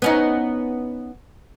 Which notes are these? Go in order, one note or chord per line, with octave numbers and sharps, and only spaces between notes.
B3 C#4 D#4